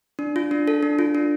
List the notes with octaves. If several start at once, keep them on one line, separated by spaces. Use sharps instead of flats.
D4
F4
D4
A4
D4
F4
D4